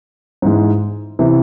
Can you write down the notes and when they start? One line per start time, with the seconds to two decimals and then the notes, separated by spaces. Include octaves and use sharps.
0.42 G#2 E3 G#3
1.19 C3 E3